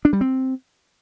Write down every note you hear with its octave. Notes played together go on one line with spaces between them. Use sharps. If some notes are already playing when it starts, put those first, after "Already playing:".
D4
G3
C4